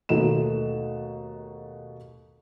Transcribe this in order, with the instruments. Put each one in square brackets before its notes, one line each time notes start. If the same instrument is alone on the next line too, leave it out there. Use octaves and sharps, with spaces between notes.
[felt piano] D#2 B2 A3 D#4 E7